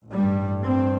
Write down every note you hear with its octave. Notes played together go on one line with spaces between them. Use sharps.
A1 G2 G3
C4